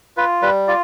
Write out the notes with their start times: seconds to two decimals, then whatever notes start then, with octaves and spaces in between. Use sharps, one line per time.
0.17 F4 B4
0.42 G3 B4
0.67 F4 D5